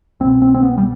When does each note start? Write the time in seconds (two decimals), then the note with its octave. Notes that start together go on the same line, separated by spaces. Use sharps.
0.20 C2 B2 C4
0.42 C4
0.54 C4
0.62 B3
0.78 G3